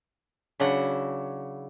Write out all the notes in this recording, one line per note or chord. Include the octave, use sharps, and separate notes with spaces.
C#3 F#3 D4 E4 F#4 F#5